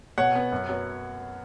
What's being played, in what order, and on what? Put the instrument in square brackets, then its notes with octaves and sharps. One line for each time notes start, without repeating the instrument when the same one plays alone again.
[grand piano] B2 C#5 F#5
B3
F#2
F#3 B3